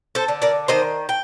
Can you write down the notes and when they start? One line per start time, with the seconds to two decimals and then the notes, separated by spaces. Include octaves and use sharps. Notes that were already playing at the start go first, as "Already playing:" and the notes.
0.15 A4 C5
0.28 D3
0.42 A#4 D5
0.68 D#3 C5 D#5
1.09 G5